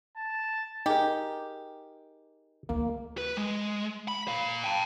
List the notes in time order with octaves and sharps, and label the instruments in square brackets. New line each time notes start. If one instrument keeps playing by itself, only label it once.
[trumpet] A5
[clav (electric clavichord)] D#4 G#4 A#4 [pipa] G4
[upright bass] D2 [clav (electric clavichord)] A#3
[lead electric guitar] B4
G#3
B5
A#2 F5
G5 A5